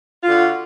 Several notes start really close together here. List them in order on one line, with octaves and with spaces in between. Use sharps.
F4 D3 F#4